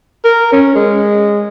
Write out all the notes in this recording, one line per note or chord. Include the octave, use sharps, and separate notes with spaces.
A#4
C#4
G#3